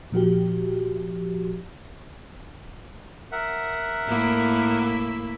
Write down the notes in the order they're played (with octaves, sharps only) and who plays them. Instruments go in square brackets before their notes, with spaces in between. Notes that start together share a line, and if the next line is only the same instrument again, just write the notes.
[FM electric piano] A#2 F3 F#4 G4
[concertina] A#4 E5 F#5
[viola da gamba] A2 A#3 E4
[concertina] E6